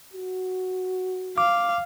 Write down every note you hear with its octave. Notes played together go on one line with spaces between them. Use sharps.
F#4
F5 D6